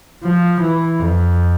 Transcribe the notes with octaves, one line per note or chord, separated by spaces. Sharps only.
F3
E3
F2